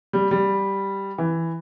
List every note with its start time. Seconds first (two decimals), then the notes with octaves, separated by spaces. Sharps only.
0.13 G3
0.31 G3
1.18 E3